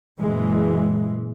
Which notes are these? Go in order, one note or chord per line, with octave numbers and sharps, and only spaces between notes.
F#1 A#2 E3 G#3